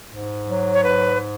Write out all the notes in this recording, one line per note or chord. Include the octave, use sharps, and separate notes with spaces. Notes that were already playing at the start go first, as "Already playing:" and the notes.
G#2
F#3
C#5
G#2 B4